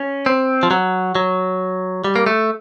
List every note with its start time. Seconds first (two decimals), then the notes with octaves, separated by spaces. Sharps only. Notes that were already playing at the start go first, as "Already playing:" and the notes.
Already playing: C#4
0.26 C4
0.63 F3
0.71 F#3
1.15 F#3
2.04 G3
2.16 A#3
2.26 A3